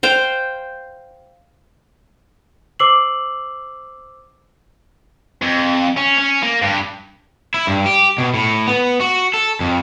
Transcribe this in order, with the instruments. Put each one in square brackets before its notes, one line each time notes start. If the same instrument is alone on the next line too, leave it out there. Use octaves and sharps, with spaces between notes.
[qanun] C5 F5 G5
[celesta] C5 D6 E6 C7 F#7
[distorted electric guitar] F2
C#4
C#4
A#3
G2
[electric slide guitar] E4
G2
G4
B2
A2
B3
F#4
A4
F2